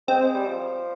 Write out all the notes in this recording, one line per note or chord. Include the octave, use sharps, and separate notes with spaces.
G#3 C4
G#3
G3
F3